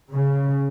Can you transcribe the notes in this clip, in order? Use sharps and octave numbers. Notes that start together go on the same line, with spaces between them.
C#3